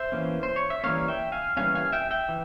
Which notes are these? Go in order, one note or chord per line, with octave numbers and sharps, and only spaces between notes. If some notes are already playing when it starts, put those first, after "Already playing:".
Already playing: C5 E5
E3 A#3 C#4
C5
C#5
E5
E3 G3 A#3 C#4 C#5 F5
E5 G5
F5 G#5
E3 G3 A#3 C#4 F5 G#5
F5 G#5
E5 G5
E5 G5
E3